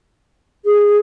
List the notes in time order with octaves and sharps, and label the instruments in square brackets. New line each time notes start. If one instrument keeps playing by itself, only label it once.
[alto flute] G#4